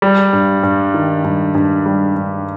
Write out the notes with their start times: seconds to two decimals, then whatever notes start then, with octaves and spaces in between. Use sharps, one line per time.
0.02 G3
0.33 G2
0.63 G2
0.94 D#3
1.24 G2
1.55 G2
1.86 G3
2.16 G2